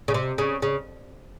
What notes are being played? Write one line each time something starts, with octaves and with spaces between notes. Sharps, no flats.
C#3
C3
C#3
C#3